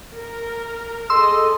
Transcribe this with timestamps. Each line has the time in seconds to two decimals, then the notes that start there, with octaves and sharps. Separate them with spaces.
0.15 A#4
1.10 G#4 A4 D#5 C6 E6